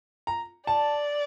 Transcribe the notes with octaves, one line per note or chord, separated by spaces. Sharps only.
A#5
D5 A5